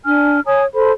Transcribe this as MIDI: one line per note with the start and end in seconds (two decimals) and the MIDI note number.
0.05 0.39 62
0.05 0.39 80
0.05 0.39 89
0.45 0.63 73
0.45 0.63 80
0.45 0.63 82
0.45 0.63 87
0.74 0.91 69
0.74 0.91 72
0.74 0.91 83